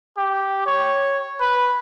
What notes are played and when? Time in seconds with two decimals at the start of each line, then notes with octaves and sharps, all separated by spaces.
0.17 G4
0.66 C#5
1.40 B4